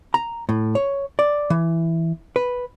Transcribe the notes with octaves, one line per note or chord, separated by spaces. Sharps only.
A#5
A2
C#5
D5
E3
B4